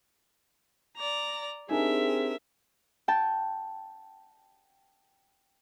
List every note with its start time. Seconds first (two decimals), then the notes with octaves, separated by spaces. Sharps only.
0.97 D5 A#5
1.69 C4 D4 D#4 G4 G#4 A#4 E5 G#5
3.08 G5 A5